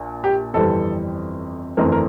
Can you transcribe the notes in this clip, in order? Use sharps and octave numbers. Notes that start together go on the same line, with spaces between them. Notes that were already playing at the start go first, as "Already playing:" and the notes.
Already playing: A#1 A#2
G4
G1 F2 E3 G3 C4 A4
G1 F2 E3 A3 C4 A#4
A#4